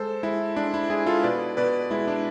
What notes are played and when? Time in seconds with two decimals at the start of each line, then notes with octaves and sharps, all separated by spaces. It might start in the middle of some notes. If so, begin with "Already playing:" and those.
Already playing: G#3 A4 C5
0.23 G#3 E4
0.56 G#3 D4
0.74 E4
0.90 G#3 E4 G#4
1.06 F4 A4
1.23 B2 B4 D5
1.57 B2 B4 D5
1.91 G#3 E4
2.07 D4